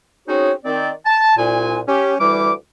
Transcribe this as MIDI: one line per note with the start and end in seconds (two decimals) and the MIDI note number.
0.28 0.52 60
0.28 0.52 61
0.28 0.52 63
0.28 0.52 66
0.28 0.52 68
0.28 0.52 73
0.65 0.90 51
0.65 0.90 60
0.65 0.90 74
1.06 1.35 81
1.38 1.80 36
1.38 1.80 46
1.38 1.80 80
1.88 2.15 61
1.88 2.15 67
2.20 2.52 38
2.20 2.52 52
2.20 2.52 55
2.20 2.52 86